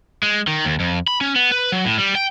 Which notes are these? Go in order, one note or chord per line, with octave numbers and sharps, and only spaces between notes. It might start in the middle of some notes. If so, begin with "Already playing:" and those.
G#3
D#3
D#2
F2
B5
C#4
B3
B4
F#3
A2
G3
G5